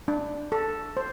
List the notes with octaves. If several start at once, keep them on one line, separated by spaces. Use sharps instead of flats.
D4
A4
C5